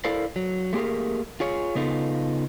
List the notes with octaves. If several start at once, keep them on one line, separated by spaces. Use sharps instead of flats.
E4 A4 A#4 C5 D5 F5
F#3
A3 A#3 G4 G#4 A#4
F4 G#4 C#5
C#3 B3 D#4 F4 A4